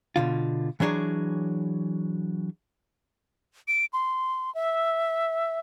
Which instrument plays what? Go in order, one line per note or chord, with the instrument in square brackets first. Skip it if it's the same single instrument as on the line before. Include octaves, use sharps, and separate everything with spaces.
[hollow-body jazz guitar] B2 D3 F4
E3 F#3 D4 G#4 C#5
[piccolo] D7
C6
E5